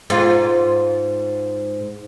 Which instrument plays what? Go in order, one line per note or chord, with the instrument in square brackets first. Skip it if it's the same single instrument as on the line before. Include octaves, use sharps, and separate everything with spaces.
[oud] G#2 F4